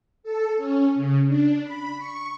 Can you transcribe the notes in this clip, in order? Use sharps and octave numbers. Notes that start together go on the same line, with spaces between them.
A4
C#4
C#3
D4
B5
C#6